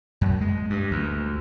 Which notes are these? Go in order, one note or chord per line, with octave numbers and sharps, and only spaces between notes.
F#2
G#3
G2
D2